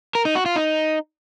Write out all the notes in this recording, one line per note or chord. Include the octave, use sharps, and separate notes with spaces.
A#4
D#4
F#4
F4
D#4